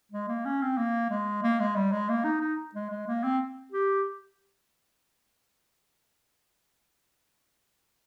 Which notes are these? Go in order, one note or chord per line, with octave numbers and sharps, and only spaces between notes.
G#3
A#3
C#4
C4
A#3
G#3
A#3
G#3
G3
G#3
A#3
D#4
D#4
G#3
G#3
A#3
C4
G4